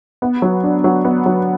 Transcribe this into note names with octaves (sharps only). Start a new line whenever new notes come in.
B3
F#3
D4
F#3
B3
F#3